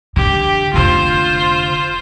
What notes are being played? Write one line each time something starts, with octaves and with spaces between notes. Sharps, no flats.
D3 G4
F1 D3 F4 C5